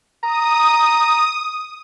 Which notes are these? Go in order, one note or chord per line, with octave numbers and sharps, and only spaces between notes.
A#5 D#6